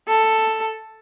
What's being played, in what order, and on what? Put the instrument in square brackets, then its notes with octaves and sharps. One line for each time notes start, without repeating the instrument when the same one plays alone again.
[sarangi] A4